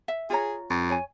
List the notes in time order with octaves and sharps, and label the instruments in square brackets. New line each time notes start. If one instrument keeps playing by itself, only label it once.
[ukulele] E5
[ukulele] F4 C#5 A#5 [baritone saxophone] G#4
[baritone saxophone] F2
[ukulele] C#5 G#5